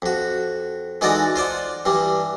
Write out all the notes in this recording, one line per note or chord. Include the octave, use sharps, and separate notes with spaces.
F2 F#4
E3 G#3 D#4 F#4 A4 D5
F4 C5 D5 F#5
G2 E3 G3